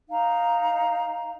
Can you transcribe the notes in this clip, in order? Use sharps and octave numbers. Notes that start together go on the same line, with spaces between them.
D#4 F5 A#5